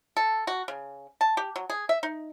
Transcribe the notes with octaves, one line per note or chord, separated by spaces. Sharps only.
A4
F#4
C#3
A5
G4
F#3
G#4
E5
D#4